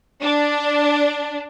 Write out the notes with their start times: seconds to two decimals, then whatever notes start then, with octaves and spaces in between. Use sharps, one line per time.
0.23 D4